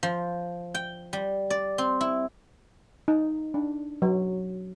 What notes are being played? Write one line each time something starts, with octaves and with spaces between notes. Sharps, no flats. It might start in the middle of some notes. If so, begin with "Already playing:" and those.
F3
G5
G3
D5
C4
E4
D#4
D4
F#3